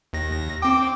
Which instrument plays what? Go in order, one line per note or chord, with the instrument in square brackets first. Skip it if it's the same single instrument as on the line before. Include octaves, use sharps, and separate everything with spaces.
[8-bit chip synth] D#2 A#6
[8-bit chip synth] C4 G5 [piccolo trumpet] D6